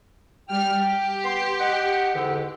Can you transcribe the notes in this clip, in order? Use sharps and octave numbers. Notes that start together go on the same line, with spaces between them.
G3 G5 F6
G4
B3 G5 C6
D#5 F#5
E2 G#2 D3